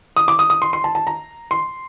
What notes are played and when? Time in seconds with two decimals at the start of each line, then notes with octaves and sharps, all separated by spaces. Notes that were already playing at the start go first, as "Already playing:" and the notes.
0.17 D#6
0.28 D6
0.39 D#6
0.50 D#6
0.62 C6
0.73 C6
0.84 A5
0.95 A5
1.07 A#5
1.51 C6